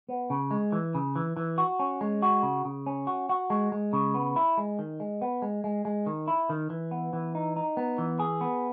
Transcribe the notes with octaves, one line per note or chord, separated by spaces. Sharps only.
B3
C#3
G#3
E3
C#3
E3
E3
F#4
C#4
G#3
F#4
C#3
C#3
C#4
F#4
F#4
G#3
G#3
C#3
B3
E4
G#3
D#3
G#3
B3
G#3
G#3
G#3
D#3
E4
D#3
E3
B3
E3
D#4
D#4
B3
E3
G#4
B3